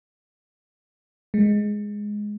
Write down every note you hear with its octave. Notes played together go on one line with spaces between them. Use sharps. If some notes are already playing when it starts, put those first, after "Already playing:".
G#3